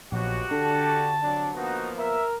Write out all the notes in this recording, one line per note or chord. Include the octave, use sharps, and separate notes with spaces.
A#1 B2 F3 F#3 F#4 G4
D3 D4 A4 A5
C3 F#3 D4
F3 A#3 B3 D#4 F#4
A#4 E5